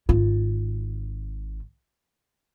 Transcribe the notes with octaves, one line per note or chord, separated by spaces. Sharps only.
G#1 F4